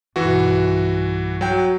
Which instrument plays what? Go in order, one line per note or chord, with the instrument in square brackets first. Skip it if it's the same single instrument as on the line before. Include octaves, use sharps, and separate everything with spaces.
[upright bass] B1 G2 [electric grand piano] E3 F#4
[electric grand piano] F#3 G5